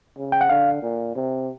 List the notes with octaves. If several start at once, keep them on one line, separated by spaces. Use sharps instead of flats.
C#3
G5
F#5
D3 F5
A#2
C3